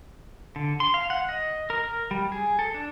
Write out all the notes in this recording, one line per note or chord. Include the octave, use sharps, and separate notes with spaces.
D3
C6
F5
F#5
D#5
A#4
A#4
G3
G#4
A4
D4